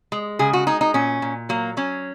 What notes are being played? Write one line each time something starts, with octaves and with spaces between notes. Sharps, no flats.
G#3
C#3 G#4
F#4
G#3 D#4
D#4
A#2 C#4
A#2
F#3 A#3
F#3 C#4